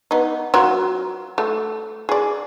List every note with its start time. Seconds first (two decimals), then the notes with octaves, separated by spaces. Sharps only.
0.11 B3 D#4
0.54 F#3 F4 A#4
1.38 A3
2.09 G#4 D5